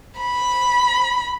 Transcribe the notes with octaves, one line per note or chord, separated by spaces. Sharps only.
B5